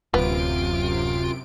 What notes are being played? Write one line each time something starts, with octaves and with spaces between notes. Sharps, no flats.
D1 F#2 C3 B3 F4 D7